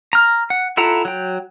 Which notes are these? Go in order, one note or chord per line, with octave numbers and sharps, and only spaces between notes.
A#5 F6
F#5
E4 F4 A4 F#5 A#5
F#3 G5